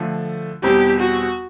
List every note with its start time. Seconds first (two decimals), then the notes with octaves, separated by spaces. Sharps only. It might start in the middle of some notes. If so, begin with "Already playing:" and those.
Already playing: D3 F3 A3
0.63 E2 B2 G3 C4 G4
1.01 F#4